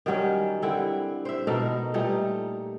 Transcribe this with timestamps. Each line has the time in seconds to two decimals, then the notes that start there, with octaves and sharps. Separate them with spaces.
0.06 D#3 F#3 G3 C#4
0.62 D3 G3 C4 E4
1.25 C5 E5
1.47 B2 D#4 A4 A#4
1.94 A#2 G3 A3 D#4